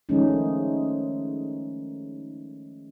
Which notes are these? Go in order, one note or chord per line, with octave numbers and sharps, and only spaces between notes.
D#3 F3 G#3 A3 C#4 D#4